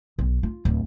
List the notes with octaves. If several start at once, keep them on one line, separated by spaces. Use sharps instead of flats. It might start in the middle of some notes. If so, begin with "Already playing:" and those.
B1
F4
D1